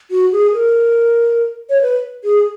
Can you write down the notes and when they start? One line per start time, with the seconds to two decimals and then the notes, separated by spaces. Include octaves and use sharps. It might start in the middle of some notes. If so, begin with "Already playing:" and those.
0.11 F#4
0.32 G#4
0.53 A#4
1.70 C#5
1.81 B4
2.24 G#4